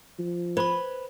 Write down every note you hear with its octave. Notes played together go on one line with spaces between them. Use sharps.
F3
B4 C5 B5